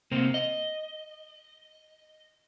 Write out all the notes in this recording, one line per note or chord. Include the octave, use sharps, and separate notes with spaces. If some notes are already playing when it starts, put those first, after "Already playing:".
C3 A#3 C4
D#5